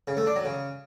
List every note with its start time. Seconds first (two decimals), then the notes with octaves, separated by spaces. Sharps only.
0.08 C#3
0.17 A3
0.26 D4
0.36 F#3
0.45 C#3